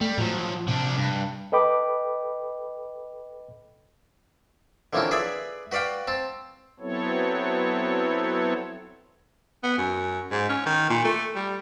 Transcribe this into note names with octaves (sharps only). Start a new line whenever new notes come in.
G3 A3
A2 F3 F#3
C3 F3 D4
G2
A4 B4 D#5 G5 B5 D6
D3 E3 F3 A#3 C4 C#4
G#4 B4 D5 E5 G#5
F#4 B4 D5 F5 G5
C4 A5
F#3 B3 C4 E4 A4 C#5
B3
F#2
G#2
C#4
D#3
A#2
A3
G3